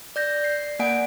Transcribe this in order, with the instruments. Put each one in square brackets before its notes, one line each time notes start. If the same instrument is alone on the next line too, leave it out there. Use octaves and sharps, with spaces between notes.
[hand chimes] D5 G6 A#6
C7
A#3 D5 F#5 G#5 D7